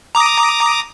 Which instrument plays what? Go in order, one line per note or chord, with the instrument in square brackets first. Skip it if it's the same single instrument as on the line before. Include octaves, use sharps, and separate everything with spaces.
[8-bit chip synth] A#5 D6 D#6